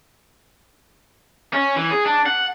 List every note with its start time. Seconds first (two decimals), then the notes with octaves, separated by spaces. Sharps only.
1.53 C#4
1.76 E3
1.91 G#4
2.06 D4
2.26 F#5